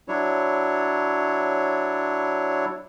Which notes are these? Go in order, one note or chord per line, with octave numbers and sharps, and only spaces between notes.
F#3 D4 E4 C#5